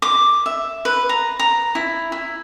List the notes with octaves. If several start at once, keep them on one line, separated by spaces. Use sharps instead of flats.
D6
E5
B4
A#5
A#5
E4
E4